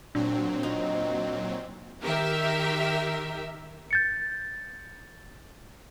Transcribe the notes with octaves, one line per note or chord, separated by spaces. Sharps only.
A#2 F#3 C4 D4
D#4
D#3 G4 A#4 E5
G6 A6 C#7